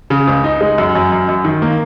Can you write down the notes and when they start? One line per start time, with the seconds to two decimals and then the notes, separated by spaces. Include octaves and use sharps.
0.10 C#3
0.27 C#2
0.44 D#4
0.61 G#3
0.78 F#2
0.95 F#2
1.12 F#2
1.29 F#2
1.45 D#3
1.62 A#3